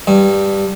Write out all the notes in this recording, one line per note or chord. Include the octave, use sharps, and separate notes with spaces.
G2